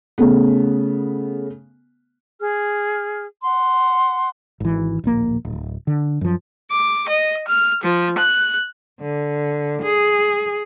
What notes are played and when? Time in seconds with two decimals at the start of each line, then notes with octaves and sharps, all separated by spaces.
0.18 C#3 A3 B3
2.39 G#4 F6
3.43 F#5 C6
4.60 G#1 E3
5.04 D1 A#1 A#3
5.45 D1
5.87 D3
6.21 F#2 F3
6.71 D6
7.08 D#5
7.47 F6
7.83 F3
8.18 F#6
9.01 D3
9.83 G#4